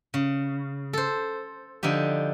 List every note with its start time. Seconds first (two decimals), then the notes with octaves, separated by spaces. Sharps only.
0.14 C#3
0.93 A4 C5
1.83 D3 F3 D#4 G4